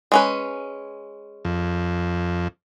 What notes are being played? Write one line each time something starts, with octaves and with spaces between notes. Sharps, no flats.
G#3 C#4 B4
F2